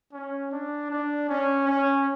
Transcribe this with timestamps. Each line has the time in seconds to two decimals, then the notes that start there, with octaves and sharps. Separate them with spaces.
0.13 C#4
0.52 D4
0.90 D4
1.29 C#4
1.67 C#4